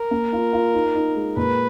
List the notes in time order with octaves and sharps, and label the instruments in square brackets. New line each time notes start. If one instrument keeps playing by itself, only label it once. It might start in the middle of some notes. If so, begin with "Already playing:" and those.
Already playing: [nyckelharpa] A#4
[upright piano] A#3
F4
F4
D#4
D#4
G#3
[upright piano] A#2 [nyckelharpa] B4